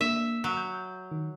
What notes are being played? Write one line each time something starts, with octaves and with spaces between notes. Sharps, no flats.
A#3 D4 E5
F#3
G6
D#3